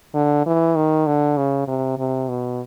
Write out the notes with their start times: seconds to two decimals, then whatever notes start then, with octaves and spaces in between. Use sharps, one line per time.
0.15 D3
0.46 E3
0.76 D#3
1.07 D3
1.37 C#3
1.68 C3
1.98 C3
2.29 B2